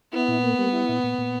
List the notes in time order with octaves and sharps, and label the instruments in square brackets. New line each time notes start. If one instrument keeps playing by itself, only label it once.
[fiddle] B3 [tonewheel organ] E4
[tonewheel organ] A#2
A#3
G3
E4
A#2
A#2
A#2